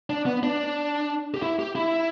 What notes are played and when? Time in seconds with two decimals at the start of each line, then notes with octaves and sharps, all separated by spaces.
0.10 D4
0.26 B3
0.43 D4
1.34 G4
1.42 E4
1.59 G4
1.75 E4